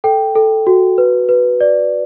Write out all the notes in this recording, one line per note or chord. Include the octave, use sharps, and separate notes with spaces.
A4 G5
A4
F#4
B4
B4
D5